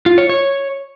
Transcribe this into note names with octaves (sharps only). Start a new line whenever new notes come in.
F4
C#5
C#5